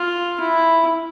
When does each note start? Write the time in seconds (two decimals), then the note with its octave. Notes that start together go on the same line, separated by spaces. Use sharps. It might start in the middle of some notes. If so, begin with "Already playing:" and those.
Already playing: F4
0.40 E4